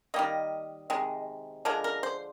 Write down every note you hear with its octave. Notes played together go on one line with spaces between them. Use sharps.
D#3 G3 A#3 D#5
C3 D#3 G#3
D3 F3 G#3 A#4
A#4
C5